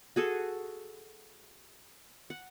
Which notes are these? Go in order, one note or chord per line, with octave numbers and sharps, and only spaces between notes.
F#4 G#4 A4
F#5